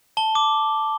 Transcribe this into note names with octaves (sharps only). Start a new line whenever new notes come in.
A5 G7
D6